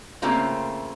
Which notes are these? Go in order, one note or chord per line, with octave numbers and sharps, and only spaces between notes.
C#3 A3 A#3 C4 F4